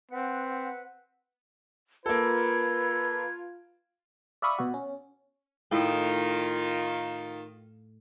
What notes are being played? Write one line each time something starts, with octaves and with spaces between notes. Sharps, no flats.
C4 B4 F#5
A#3 F4 A4 B4 G#6
D5 E5 F5 B5 C#6 D#6
B2 F#4
C#4
A2 D#3 F4 D#5 G5